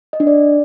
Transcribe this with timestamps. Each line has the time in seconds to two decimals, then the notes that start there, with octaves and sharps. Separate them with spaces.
0.13 D#5
0.20 D4
0.27 D5